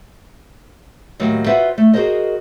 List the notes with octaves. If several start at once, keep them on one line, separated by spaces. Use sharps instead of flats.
D#2 A2 D#3 F#3
F4 F#4 B4 C5 E5 F#5
A3
F#4 G#4 A#4 C5 D#5